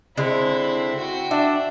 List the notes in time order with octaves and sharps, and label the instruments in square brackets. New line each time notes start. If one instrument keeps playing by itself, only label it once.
[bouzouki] D3 G#3 [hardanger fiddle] C4 E4
[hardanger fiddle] F#4 G5
[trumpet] D4 [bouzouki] E5